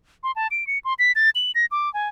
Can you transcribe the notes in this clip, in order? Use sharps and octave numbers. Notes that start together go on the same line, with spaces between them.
C6
A5
D7
C#7
C6
B6
A6
F#7
A#6
D6
G#5